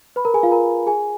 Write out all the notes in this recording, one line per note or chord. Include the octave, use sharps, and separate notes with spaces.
B4 B5
A#4 A#5
G#4 G#5
F4 F5
A#4 A#5
G#4 G#5